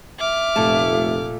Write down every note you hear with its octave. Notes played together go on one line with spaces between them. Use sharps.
E5 D6 F6
F1 A#2 A3 A5